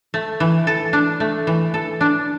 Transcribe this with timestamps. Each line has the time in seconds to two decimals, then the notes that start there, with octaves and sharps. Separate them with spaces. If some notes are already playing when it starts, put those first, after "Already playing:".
0.14 A3
0.40 E3
0.67 A4
0.93 D4
1.20 A3
1.47 E3
1.74 A4
2.01 D4